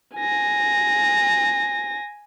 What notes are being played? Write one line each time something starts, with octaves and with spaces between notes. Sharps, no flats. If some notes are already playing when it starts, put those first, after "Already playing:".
G#5 A#6